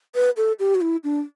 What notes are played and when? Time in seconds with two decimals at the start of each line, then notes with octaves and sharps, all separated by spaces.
0.15 B4
0.37 A4
0.59 G4
0.75 F#4
0.81 E4
1.04 D4